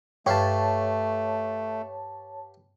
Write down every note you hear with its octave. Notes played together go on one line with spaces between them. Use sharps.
G2 A3 G4 B4 C#5 F5 A5